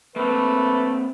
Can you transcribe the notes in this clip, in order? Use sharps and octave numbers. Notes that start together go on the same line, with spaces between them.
A3 A#3 C4 B4